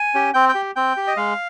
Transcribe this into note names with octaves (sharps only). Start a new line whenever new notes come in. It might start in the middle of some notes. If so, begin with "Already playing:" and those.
Already playing: G#5
C#4 G4
C4 G5
G5
G4
C4 G5
G4
D#5
G#3 F5